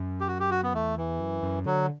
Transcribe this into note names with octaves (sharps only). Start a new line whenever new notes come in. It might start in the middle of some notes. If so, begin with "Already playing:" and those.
Already playing: F#2
G4
F#4
G4
F#4
B3
E2 A3
E3
F#2
F#2
D3 F#3